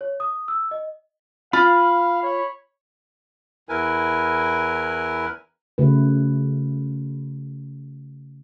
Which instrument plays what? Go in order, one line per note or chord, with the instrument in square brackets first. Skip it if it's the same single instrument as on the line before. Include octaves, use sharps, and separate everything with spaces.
[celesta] C#5
D#6
E6
D#5
[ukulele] F4 [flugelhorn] F5 [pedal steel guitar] B5
[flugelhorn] C#5
[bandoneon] E2 E4 A#4 B4 G#5
[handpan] C#3 A3 F#4 B4